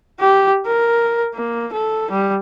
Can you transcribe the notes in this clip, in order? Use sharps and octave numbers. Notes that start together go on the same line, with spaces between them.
G4
A#4
A#3
A4
G3